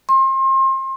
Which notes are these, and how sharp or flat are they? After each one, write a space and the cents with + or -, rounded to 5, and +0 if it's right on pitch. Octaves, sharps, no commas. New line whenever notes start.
C6 +35